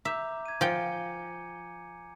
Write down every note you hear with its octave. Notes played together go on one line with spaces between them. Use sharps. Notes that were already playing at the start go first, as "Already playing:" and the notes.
E5 A#5 D6 G6
G#6 D#7
F3 G5 G#5 C#7